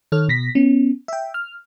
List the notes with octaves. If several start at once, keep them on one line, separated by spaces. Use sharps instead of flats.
D#3 A4 C#5 F6
B2 A#6 B6
B3 C#4
E5 G5
F6